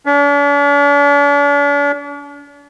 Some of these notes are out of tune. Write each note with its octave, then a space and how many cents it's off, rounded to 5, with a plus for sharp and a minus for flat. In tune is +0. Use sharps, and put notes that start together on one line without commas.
D4 -45